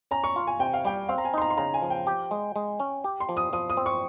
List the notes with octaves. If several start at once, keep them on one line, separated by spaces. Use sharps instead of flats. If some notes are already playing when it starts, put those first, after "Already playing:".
C#4 A#5
C#6
F4
G#5
C3 G5
F5
G3 G5
C4 F5
A#5
G#5
D#4 C6
A#5
C6
C#3 A#5
G#5
F3
G5
G4
G#3
G#3
C#4
G4
C6
F3
D#6
F3 D#6
D#6
C4
C#6